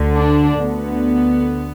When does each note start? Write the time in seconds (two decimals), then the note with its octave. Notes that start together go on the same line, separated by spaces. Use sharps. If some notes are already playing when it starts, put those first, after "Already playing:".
Already playing: D2 D3
0.14 D4
0.60 D2 D3 B3